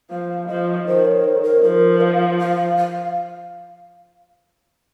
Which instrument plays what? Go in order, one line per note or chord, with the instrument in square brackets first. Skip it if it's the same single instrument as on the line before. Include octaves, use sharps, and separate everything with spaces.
[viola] F3 [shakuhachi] F5
[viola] F3 [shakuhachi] D#5
[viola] D#3 [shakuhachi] C5
[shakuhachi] C#5
C5
A4
A#4
[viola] F3 [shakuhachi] A#4
[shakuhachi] F5
F5
F5